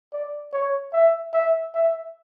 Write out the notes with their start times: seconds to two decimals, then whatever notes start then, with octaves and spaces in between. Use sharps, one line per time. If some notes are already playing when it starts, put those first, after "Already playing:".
0.13 D5
0.53 C#5
0.93 E5
1.34 E5
1.75 E5